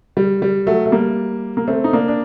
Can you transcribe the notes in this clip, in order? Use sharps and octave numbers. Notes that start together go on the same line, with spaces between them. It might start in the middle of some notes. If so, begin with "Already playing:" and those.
G3
G3
F#3 A3
A3
G3 A#3
A#3
A3 C4
D#4
A#3 D4
D4